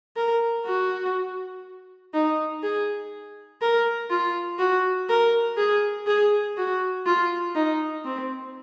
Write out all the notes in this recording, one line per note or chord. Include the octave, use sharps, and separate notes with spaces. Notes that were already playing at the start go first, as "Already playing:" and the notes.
A#4
F#4
D#4
G#4
A#4
F4
F#4
A#4
G#4
G#4
F#4
F4
D#4
C4